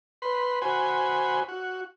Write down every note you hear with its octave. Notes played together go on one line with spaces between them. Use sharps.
B4 C6
F#4 C5 G#5 B5
F#4